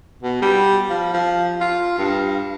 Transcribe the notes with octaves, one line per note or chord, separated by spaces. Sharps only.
B2
G3
F3
F3
F4
G2